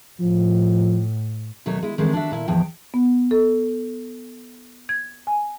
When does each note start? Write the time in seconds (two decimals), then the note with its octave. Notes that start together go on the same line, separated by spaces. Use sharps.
0.20 A2 F3
1.66 D#2 B2 F#3 A3 C#5
1.83 G#3 E4
1.98 D#3 E3 G#3 A3 C4 D4
2.13 D4 F#4 E5
2.31 A#2 E4
2.48 E2 A2 F3 G5
2.94 B3
3.31 A4
4.89 G#6
5.27 G#5